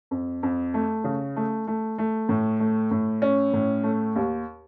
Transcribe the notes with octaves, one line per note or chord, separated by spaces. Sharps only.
F2
F2
A3
C#3
A3
A3
A3
A2
A3
A2
C#4
A2
A3
D#2